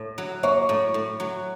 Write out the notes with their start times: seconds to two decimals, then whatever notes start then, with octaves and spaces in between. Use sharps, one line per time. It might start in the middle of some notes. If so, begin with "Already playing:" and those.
Already playing: A2
0.18 F#3
0.43 A#3 C#5 C#6
0.69 A2
0.94 A2
1.20 F#3